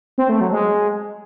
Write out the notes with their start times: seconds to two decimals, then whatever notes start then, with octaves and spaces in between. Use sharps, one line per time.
0.18 C4
0.29 A3
0.41 F#3
0.52 G#3